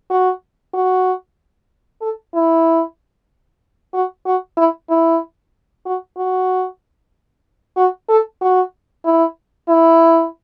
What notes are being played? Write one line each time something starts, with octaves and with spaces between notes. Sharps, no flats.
F#4
F#4
A4
E4
F#4
F#4
E4
E4
F#4
F#4
F#4
A4
F#4
E4
E4